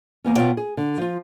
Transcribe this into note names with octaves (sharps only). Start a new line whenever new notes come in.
E2 A#3 B3 C#4
B2 B3 C#4 F4 C#5 G5
G#4
D3
F3 F4